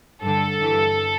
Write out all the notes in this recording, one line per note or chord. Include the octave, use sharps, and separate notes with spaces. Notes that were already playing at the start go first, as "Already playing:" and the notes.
G2 D3 A4
G2 E3